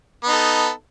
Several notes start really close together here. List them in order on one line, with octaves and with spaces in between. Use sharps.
B3 D#4 A4